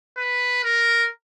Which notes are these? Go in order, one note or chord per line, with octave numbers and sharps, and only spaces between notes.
B4
A#4